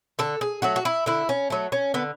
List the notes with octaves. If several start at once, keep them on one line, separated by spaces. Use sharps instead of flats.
D3 A4
G#4
F#3 A3 F#4
F#4
E4
D3 E4
C#4
F#3 A3
C#4
D3 B3